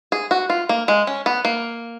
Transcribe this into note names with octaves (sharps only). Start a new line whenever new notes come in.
G#4
F#4
F4
A#3
G#3
C#4
B3
A#3